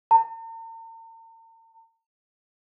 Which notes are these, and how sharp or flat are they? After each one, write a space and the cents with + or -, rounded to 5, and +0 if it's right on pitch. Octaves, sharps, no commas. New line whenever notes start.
A#5 -45